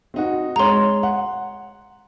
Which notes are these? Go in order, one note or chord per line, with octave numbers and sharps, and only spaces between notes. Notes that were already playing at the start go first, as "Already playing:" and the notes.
C4 D#4 F#4
G#3 C#5 A#5 C6
F#5